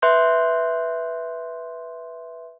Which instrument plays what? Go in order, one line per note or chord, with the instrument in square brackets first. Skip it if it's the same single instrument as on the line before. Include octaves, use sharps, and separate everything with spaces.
[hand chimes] B4 E5 C6 F#6 G6